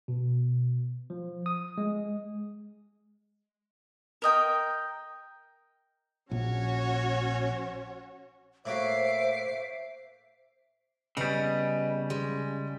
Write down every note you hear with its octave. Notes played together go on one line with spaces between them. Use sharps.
B2
F3
D#6
G#3
A#4 D#5 G5
A#1 C#4 F#4 C#5
A2 A#3 F#4 C5 E5 D6 C7
C#3 G3 B3 D#5
G#3